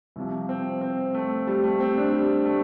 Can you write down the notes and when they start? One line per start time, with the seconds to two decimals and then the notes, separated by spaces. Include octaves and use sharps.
0.16 C2 C3 F3
0.49 C4
0.81 C4
1.14 A3
1.47 G3
1.64 A3
1.80 C4
1.97 D4
2.12 G3
2.45 A3